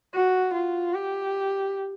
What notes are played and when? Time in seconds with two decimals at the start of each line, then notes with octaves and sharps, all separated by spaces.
0.14 F#4
0.54 F4
0.94 G4